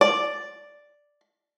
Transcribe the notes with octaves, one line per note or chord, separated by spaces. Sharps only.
D5